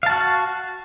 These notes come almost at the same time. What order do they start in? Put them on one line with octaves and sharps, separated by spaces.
F5 A5 F#4